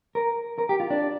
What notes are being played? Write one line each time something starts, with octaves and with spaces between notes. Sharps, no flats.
A#4
A#4
G4
F4
D4